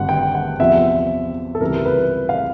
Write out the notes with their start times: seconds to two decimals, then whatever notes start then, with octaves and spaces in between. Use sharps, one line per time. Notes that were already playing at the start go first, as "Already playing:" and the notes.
Already playing: G#1 G2 D3 F#5
0.09 G5
0.35 F#5
0.60 E2 C3 F3 E5
1.55 A4
1.60 C#2 C3 E3 G3 A#4
1.86 B4
2.29 F5